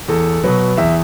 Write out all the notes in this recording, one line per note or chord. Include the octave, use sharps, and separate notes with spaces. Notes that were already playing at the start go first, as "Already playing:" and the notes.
E2 A4
B2 F#3 B4
E2 E5